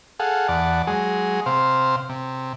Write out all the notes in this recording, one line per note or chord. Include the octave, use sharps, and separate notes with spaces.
G#4 A4 F5 F#5
E2 D5 F#5 A5
F#3 G#3 G#4
C3 C5 F5
C3